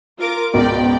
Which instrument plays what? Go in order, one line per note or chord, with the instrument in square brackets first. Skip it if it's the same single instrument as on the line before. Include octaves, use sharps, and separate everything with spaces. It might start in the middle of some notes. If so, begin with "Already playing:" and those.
[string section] F4 A#4 D6
[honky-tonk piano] C#2 G#2 B2 [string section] D5 G5